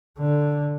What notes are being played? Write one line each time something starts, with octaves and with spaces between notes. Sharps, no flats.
D3